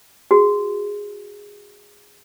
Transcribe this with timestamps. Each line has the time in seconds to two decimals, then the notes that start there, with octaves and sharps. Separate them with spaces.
0.31 F#4 G#4